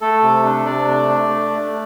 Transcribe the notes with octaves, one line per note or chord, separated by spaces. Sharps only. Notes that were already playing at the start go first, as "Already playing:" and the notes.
A3 A4
C3
D4
C3 D5
A3
D4
A3
A3